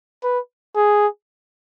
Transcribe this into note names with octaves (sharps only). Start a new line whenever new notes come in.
B4
G#4